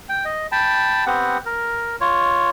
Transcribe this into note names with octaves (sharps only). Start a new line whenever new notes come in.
G5
D#5
G5 A5 B5
B3 C4 G4 F#5
A#4
F4 C#5